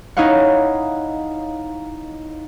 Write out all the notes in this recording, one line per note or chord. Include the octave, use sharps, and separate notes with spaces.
D#4 E4 C#5 F5 F#5